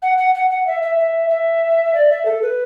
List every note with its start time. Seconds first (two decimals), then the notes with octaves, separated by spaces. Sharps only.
0.02 F#5
0.18 F#5
0.35 F#5
0.50 F#5
0.67 E5
0.82 E5
0.99 E5
1.30 E5
1.95 D5
2.10 E5
2.26 A4
2.42 B4